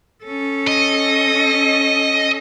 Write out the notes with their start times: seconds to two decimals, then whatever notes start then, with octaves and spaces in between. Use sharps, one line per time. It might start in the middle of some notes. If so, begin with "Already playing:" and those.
0.24 C#4 A4
0.68 D#5